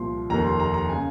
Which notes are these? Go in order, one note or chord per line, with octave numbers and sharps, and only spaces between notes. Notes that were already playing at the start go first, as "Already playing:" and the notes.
Already playing: C2 A#2 F3 C6
F1 D#2 D#3 A#5
C6
A#5
A#5
C#3 G#5